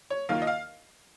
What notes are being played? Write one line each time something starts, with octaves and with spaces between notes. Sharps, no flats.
C#5
D#2 D#3 A#3 F4 F5
D#5
F5